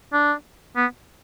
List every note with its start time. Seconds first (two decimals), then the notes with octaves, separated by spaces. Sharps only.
0.13 D4
0.76 B3